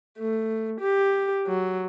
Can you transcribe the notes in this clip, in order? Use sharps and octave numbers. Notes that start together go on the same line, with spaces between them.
A3
G4
F#3